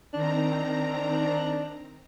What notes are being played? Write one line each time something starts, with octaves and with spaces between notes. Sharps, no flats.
D#3 C4 D4 A#5